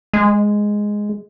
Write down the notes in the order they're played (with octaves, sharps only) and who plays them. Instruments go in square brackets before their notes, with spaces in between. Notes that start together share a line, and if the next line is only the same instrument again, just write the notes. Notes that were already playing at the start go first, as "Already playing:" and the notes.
[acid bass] G#3